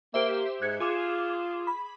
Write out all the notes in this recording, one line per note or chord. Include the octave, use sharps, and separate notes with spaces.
A#3 G4 C5 E5
G#2 F#6 G#6 C#7
F4 G#4 D6 E7
B5